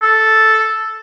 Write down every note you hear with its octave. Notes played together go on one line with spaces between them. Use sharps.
A4